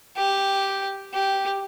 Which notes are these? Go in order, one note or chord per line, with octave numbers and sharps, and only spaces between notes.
G4
G4